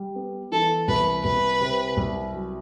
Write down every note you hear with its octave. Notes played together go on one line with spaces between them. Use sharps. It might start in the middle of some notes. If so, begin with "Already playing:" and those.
Already playing: G3
B3
E3 A4
C2 B4
C2 B4
C3
C2
F#3